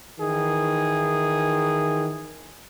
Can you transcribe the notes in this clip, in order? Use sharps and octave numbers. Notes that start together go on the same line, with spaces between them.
D#3 E3 G#4